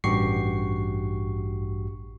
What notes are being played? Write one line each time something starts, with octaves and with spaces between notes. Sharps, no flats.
A1 G2 F#4 G4 C#6 C7